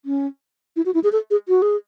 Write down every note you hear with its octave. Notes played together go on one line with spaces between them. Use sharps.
C#4
E4
F#4
E4
G#4
A4
G#4
F#4
G#4